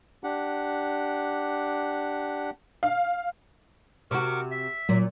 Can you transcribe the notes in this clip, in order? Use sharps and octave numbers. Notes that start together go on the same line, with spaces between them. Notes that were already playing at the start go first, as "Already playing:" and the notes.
D4 G4 F#5
F5
C3 F#4 A#4 C#6 D6
E5
A#2 F#3